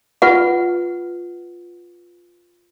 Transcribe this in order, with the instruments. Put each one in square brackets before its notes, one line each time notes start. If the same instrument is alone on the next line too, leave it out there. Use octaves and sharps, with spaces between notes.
[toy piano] F4 B4 F#5